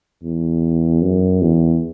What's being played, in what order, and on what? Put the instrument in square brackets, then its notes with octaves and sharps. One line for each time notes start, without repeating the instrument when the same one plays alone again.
[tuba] E2
F#2
E2